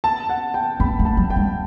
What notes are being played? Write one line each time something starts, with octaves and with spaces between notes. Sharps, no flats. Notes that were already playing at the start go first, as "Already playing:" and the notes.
A5
F#5
G5
B3 B5
A3
A5
F#3
G5
G3